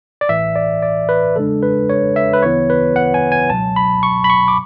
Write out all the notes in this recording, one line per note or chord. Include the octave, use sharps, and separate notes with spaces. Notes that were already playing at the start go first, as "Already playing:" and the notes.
D5
A1 A2 E3 E5
D5
D5
B4
E2 C#3 G#3 D4 A4
B4
C#5
E5
B4
D2 C#3 E3 B3 E4 C#5
B4
F#5
G#5
G#5
C#2 B2 F#3 A5
B5
C#6
B5
C#6
D6